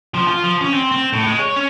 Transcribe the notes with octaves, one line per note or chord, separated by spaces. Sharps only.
F3
F4
F3
C#4
C4
C4
A2
G#3
C#5
C#4